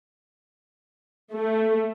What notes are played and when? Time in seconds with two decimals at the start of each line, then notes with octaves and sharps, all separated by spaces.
1.32 A3